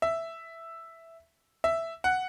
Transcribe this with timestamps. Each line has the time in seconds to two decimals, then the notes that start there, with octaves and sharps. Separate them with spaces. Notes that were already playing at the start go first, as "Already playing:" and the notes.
0.02 E5
1.64 E5
2.04 F#5